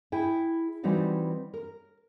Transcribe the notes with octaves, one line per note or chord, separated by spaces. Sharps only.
E4 G#4 G5
E3 G3 C4 D#4 F#4 D5
A#4